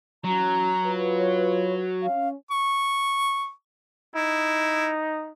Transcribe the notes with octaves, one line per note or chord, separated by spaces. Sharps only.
E3 F#3 C#4 F#4 A#5
F4 B4
C#5
C#4 F5
C#6
D#4 E4